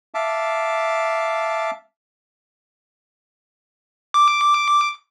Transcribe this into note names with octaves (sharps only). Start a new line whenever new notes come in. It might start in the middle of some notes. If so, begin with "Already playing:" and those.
E5 F5 A5 D6
D6